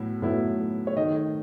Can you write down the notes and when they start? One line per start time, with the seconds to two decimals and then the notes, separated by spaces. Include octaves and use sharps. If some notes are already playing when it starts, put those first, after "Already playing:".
Already playing: A2 F#3 B3 E4
0.22 A2 F#3 B3 E4
0.87 C#5
0.96 D#3 A3 D#4 D#5